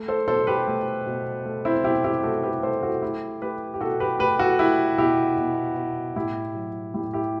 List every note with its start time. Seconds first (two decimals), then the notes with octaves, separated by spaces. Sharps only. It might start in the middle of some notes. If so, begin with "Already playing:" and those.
Already playing: A3
0.08 A4 C5
0.28 B2 A4 C5
0.47 G4 B4
0.67 A3
1.06 B2
1.45 A3
1.65 C4 E4
1.84 B2 E4 G4
2.04 E4 G4
2.23 A3 F#4 A4
2.43 G4 B4
2.63 A3 A4 C5
2.83 F#4 A4
3.02 A3 E4 G4
3.42 A3 G4 B4
3.74 G4
3.81 B2 F#4 A4
4.00 G4 B4
4.19 A3 G4 B4
4.39 F#4 A4
4.59 A3 E4 G4
4.98 B2 E4 G4
5.38 B2
5.77 B2
6.16 A2 E4 G4
6.55 F#3
6.94 A2 E4 G4
7.13 E4 G4